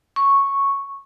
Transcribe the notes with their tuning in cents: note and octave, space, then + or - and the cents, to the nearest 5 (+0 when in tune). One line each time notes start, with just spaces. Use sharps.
C#6 -5